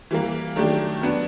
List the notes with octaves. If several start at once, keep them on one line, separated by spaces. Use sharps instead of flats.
E3 G3 A#3
D#3 F#3 A3 D4 G4
F#3 B3 D4 F#4